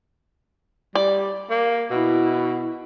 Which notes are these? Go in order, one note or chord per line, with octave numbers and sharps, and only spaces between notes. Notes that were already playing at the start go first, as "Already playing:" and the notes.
G3 D5
A#3
B2 E4